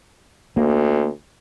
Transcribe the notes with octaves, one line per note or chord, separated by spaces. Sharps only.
D2 A#3